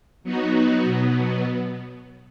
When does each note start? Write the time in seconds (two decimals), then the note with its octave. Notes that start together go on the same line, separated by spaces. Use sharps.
0.24 F#3 B3 D#4 F#4
0.83 B2 F#3 B3